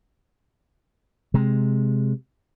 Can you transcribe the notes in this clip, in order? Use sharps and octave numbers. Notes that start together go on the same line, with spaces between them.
C3 G#3